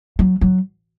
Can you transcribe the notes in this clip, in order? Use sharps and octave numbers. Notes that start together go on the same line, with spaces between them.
F#3
F#3